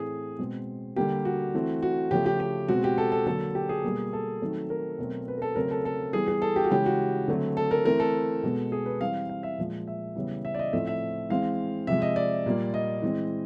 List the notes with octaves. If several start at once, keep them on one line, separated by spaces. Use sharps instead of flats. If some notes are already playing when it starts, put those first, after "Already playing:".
Already playing: A2 E3 A3 C4 G#4
B2 G#3 C4
D3 G3 A#3 G4
F#4
E3 A3 C4
F#4
C#3 F3 A3 G4
G4
G4
B2 G#3 C4 F#4
G4
A4
A4
D3 F#3 A#3 A4
G4
G#4
B2 G3 A#3
A4
D#3 F#3 A3 C4
A#4
B2 F#3 A3 C4
B4
A#4
A4
C#3 F#3 A3 C4 A#4
A4
A4
E3 G3 B3 G#4
G#4
A4
G4
F#4
C#3 E3 G#3 G4
F#4
D3 F#3 A3 C4
A4
A#4
E3 A3 C4 A#4
A4
B2 G#3 B3
G#4
B4
E3 G3 C4 F5
F5
E5
A#2 F3 G#3
E5
C#3 E3 G3 B3
E5
D5
D#5
A2 F3 A3 C4 E5
E5
E3 G#3 C4 F5
C3 F3 G#3 E5
D#5
D5
A#2 G3 A#3
D#5
E3 G#3 C4